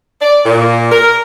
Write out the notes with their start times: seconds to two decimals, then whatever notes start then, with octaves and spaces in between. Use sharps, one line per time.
0.22 D5
0.46 A#2
0.92 A#4